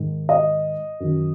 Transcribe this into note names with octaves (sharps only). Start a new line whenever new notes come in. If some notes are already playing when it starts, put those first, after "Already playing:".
Already playing: G#2 D#3
D#5
F#2 D#3